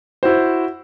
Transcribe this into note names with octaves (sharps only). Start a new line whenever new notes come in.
E4 F#4 C5